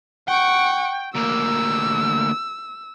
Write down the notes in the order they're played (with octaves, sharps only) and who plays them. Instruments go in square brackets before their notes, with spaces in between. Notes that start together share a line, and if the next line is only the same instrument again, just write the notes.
[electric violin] F#5 C#6 [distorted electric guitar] G5
[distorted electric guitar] D2 A#3 [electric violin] E6